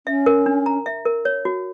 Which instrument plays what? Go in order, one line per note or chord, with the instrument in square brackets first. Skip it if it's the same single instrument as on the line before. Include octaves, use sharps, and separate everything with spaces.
[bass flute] C#4 [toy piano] E5
[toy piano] A#4
D4
A#5
E5
A#4
C#5
F#4